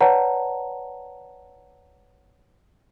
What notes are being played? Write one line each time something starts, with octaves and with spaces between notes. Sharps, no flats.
B4 C#5 D5 F#5 A5 A#5